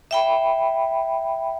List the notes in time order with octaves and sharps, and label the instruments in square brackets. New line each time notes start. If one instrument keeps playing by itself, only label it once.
[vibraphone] E5 G5 B5